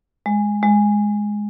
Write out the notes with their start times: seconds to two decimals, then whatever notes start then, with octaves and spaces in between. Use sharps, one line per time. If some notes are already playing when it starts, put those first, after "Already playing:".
0.26 G#3
0.63 G#3